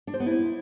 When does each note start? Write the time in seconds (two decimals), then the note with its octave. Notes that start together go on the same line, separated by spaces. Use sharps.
0.07 D4
0.14 C5
0.20 B3
0.26 E4